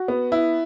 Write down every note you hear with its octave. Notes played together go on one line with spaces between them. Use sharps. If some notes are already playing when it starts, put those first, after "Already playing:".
Already playing: F#4
B3
E4